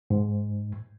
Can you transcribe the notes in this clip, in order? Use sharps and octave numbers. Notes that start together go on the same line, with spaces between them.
G#2